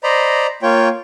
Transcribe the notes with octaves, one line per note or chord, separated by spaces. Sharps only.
C5 D5 D#5 A#5 B5
A#3 F4 C#5 G5